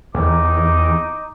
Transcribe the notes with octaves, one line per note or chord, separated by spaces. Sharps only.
E2 D#4 D6